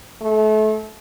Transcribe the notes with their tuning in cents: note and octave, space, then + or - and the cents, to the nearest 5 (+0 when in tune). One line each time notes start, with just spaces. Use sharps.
A3 -30